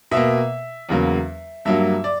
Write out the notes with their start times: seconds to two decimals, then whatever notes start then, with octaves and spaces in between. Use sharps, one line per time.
0.11 B2 A#3 E5
0.89 E2 C#3 F#3 A#3
1.65 G2 F#3 A#3 E5
2.04 D5